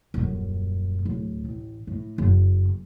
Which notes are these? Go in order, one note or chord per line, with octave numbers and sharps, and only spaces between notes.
D#1 F#2
D1
A1
A2
F#1